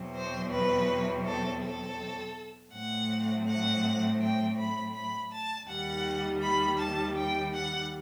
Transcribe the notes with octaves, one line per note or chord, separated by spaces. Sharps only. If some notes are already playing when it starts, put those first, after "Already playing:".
Already playing: E2 B2 F#3 C4
C5
B4
A4
A4
A2 F#3 A3 C4 F#5
F#5
G5
B5
B5
A5
D#2 D#3 G3 F#5
B5
A5
G5
F#5